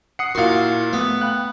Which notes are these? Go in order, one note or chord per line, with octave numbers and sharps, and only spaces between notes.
F#5 D#6 C7 C#7
A#2 E4 F#4 A#4 F5 C6
A3 B3
F5 G5 B5 F#6